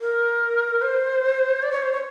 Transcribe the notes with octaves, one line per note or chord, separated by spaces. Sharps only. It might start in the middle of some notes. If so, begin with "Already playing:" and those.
A#4
C5
D5
C#5
C5
C#5